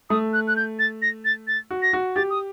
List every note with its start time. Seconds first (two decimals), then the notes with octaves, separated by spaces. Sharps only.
0.10 A3 D#6
0.33 F#6
0.48 F#6
0.56 G6
0.79 A6
1.02 A#6
1.25 A6
1.47 A6
1.71 F#4
1.82 A#6
1.93 F#4
2.16 G4 A6
2.30 D#6